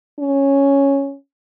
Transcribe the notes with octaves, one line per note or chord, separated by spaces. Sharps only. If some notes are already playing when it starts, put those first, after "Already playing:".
C#4